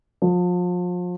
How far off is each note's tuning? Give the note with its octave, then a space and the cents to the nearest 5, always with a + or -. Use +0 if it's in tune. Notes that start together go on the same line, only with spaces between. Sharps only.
F3 +35